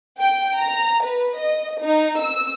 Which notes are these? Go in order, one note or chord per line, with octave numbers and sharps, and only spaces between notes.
G5
A#5
B4
D#5
D#4
E6